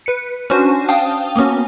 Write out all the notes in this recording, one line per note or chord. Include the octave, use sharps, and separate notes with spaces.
B4 C#7
C#4 D4 F#4 C5
F5 G5 A5 D#6
A#3 B3 C#4 F#4